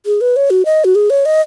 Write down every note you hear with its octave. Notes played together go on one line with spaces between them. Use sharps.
G#4
B4
C#5
F#4
D#5
F#4
G#4
C#5
D#5